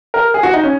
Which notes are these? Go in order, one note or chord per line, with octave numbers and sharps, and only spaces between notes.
A#4
G#4
F#4
D#4
C#4